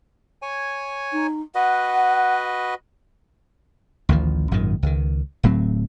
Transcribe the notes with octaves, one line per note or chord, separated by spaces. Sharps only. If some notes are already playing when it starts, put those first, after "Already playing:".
C#5 G#5
D#4
F#4 B4 D#5 F#5
A1 D2 D#3 F3
G#1 F#2 A#2 D#3
C#2 D#3
D1 A2 F#3 C4